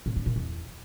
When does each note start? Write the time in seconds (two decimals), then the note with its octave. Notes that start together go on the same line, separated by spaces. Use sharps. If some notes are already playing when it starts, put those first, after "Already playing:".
0.06 A2
0.16 D3
0.26 A#2
0.36 E2